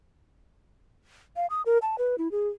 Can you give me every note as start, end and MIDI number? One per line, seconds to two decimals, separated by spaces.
1.36 1.46 77
1.50 1.62 87
1.66 1.78 70
1.82 1.96 81
1.98 2.16 71
2.18 2.31 64
2.31 2.48 68